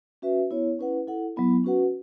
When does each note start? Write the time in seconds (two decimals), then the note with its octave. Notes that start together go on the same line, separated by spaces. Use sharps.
0.22 C#4 F#4 B4 E5
0.51 B3 E4 C#5
0.79 C#4 E4 B4 F#5
1.07 E4 A4 F#5
1.37 F#3 B3 E4
1.64 C#4 F#4 B4 F#5